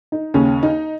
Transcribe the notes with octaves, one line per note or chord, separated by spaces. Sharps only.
D#4
D#2 C#3 C#4
D#4